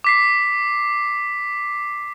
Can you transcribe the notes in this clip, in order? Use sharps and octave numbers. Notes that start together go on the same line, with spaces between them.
D6 B6 C7